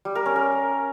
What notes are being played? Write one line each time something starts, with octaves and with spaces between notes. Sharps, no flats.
G3
A#4
C#4
A#4